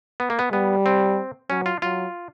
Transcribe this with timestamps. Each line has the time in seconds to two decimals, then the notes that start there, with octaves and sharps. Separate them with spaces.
0.20 B3
0.30 A#3
0.39 B3
0.52 G3 B3
0.86 C4
1.50 F#3 C#4
1.66 F4
1.82 F#3 F4